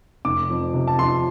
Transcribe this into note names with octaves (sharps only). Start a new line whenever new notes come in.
F1 D6
F2
C3
A5
F3 C6